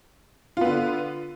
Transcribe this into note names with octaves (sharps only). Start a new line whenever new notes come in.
D3 B3 F4